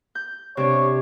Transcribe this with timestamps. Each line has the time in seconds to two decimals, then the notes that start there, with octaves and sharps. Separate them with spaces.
0.15 G6
0.57 C3 D4 C#5